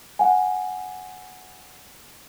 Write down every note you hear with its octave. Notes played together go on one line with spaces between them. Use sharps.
F#5 G#5